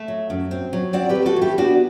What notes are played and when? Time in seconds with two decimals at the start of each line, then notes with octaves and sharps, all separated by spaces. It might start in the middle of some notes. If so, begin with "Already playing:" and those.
Already playing: A3 E5
0.08 F#3
0.30 F#2
0.51 C4
0.73 F#3
0.93 C4 D5 F#5
1.09 G4 B4
1.15 A3
1.26 F#4 A4
1.36 E3
1.42 E4 G4
1.58 B3 D4 F#4